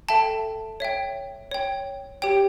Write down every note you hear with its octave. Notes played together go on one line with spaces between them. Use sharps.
A4 E5 G5 A5
C#5 E5 G5
C#5 G5
G4 C#5 G5